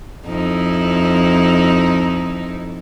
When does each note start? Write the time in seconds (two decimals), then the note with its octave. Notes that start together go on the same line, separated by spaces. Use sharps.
0.25 F2 D#4 E4